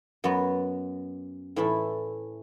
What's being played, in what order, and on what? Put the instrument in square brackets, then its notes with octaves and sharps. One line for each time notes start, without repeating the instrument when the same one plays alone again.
[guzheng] F#2 F#3 B3
A2 E3 A3 E4